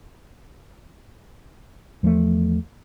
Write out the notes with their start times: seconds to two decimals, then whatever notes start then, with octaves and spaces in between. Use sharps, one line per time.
2.03 E2 F3 G3 A3